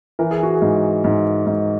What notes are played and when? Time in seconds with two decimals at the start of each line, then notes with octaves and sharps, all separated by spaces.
0.19 E3 A#4
0.31 G#4
0.43 F#4
0.55 G#4
0.62 G#2
1.04 G#2
1.47 G#2